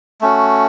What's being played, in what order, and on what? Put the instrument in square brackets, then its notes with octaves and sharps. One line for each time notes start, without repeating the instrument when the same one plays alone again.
[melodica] A3 C#4 F#4